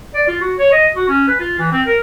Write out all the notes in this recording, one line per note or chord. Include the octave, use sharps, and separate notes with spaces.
D5
F4
F#4
C#5
D#5
F#4
C#4
B4
F4
E3
C4
A#4